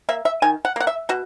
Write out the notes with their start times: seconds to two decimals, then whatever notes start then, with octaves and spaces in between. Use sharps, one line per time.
0.09 A#3 E5
0.25 E5
0.42 D#3 G#5
0.65 F#5
0.76 A#3 F#5
0.87 E5
1.09 B2 F#4